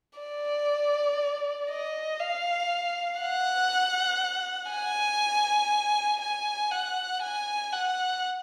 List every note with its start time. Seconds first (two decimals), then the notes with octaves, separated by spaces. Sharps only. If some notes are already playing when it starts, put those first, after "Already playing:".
0.19 D5
1.70 D#5
2.20 F5
3.21 F#5
4.71 G#5
6.21 G#5
6.72 F#5
7.22 G#5
7.73 F#5